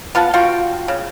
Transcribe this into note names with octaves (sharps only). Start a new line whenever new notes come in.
B3 F4 F#5 A5
F4 F#4 G5
C#3